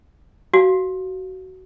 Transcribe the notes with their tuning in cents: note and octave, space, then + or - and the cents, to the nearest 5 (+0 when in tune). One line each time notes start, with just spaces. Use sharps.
F#4 +20 F5 +0